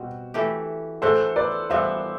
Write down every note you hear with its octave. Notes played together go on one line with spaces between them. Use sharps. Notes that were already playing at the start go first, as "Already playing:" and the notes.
Already playing: B2 G3 C4 F#4
E3 A3 E4 G4
E3 A3 D4 F#4 A4 C5
B4 D5
G2 E3 B3 F#4 C5 E5